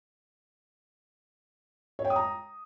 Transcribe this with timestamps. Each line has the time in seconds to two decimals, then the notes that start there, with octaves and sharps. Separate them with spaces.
1.99 C#5
2.05 G5
2.10 D#6
2.16 A#5